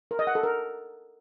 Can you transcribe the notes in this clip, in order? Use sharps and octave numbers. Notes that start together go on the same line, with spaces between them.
A#4
D#5
F#5
A4
A#4